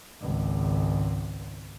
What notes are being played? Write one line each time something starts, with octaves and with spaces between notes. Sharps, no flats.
G#1 C#2